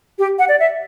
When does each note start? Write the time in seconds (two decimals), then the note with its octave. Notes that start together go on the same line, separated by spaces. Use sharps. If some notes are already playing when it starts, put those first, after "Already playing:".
0.19 G4
0.39 F#5
0.49 D5
0.60 E5